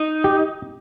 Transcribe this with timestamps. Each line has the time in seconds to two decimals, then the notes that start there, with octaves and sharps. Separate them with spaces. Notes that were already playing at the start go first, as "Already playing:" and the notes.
Already playing: D#4
0.24 G4